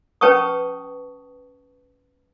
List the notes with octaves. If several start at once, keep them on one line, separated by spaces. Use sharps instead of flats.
C#4 B4 G5 A5 C#6 D#6